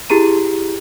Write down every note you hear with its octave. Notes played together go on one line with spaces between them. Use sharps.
E4 G4 G#4 A#5 D#7